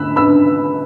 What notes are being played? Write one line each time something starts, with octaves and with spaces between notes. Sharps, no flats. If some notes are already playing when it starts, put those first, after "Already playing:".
Already playing: D3 A3 D4 B5 E6 F#6
B4 B5 E6